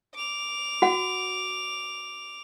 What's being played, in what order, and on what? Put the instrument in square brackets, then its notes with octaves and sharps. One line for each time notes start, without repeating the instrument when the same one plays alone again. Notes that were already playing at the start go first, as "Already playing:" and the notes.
[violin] D6 F7
[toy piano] F#4 F#5